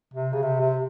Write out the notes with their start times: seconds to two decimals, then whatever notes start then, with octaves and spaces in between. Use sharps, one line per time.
0.14 C3
0.33 C#3
0.43 C3
0.60 C3